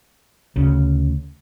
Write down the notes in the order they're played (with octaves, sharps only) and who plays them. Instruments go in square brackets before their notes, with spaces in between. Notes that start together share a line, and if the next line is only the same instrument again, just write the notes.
[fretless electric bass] D2 C#3